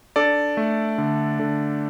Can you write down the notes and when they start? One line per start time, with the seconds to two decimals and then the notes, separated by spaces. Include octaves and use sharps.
0.16 D4 A4 D5
0.57 A3
0.98 D3
1.39 D3